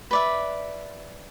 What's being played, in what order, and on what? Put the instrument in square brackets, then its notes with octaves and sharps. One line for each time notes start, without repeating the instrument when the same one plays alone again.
[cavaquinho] B4 D5 E5